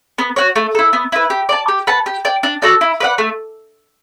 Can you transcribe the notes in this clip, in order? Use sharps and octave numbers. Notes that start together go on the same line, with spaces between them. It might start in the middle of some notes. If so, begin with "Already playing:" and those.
B3
F#4 C#5
A3
E4 A4
B3
E4 B4
G4
D5 A5
G4
B4 F#5 A5
G4
D5 G5
D4
F#4 A4 D5
E4
B4 D5 F#5
A3